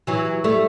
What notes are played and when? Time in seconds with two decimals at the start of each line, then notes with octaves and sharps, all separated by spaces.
0.07 E3 F#3
0.44 G3 A3